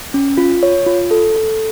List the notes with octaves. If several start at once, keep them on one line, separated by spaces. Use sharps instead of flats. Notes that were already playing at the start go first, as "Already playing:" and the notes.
C#4
F4
C#5
F4
A4
A4